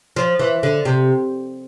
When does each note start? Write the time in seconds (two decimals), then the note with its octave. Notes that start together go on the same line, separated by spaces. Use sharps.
0.16 F3
0.39 E3
0.63 D3
0.85 C3